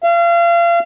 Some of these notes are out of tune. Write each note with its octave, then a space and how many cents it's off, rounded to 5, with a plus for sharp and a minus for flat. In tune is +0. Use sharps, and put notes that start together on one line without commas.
F5 -35